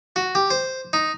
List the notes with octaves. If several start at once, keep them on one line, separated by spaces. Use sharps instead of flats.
F#4
G4
C5
D#4